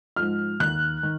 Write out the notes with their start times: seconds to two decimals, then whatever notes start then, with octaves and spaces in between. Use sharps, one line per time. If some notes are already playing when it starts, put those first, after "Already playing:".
0.16 G#2 F3 F6
0.60 D#2 F#6
1.03 D#3